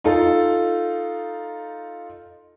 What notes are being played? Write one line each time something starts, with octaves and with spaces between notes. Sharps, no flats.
D#4 F4 A4